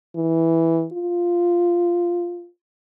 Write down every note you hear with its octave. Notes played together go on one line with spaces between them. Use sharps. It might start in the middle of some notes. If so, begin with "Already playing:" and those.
E3
F4